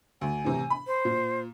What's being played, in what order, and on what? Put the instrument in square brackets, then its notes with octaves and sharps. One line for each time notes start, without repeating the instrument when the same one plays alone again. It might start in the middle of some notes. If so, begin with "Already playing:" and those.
[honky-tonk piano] D2 [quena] G#5
[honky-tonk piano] A2 C3 E3
B5
[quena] C5
[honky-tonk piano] A#2